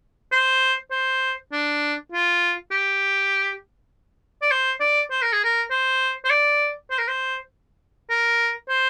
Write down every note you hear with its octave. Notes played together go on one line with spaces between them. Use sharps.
C5
C5
D4
F4
G4
D5
C5
D5
C5
A#4
G#4
A#4
C5
C5
D5
C5
A#4
C5
A#4
C5